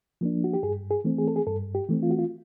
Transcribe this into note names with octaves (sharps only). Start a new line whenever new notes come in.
F3 A#3 D4
F#4
G4
G2 G#4
G#4
E3 A3 C4
G#4
A4
G#4
G2 A4
G4
E3 A3 C4
F4
F#4
F4